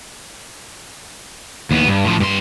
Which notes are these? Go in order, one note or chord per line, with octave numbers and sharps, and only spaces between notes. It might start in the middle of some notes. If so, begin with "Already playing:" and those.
D#2 B3
G2
A2 F3
G2 C6